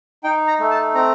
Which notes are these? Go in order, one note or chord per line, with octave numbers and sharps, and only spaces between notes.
D#4 G5
A#5
A3
A5
C4 A#5